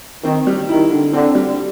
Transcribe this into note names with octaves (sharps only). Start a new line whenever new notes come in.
D#3 C4
G3
D#3 E4
D3
D3 C4
G3